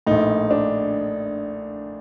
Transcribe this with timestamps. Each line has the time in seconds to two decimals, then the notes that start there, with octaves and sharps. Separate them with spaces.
0.07 A#1 A2 D#4
0.51 D4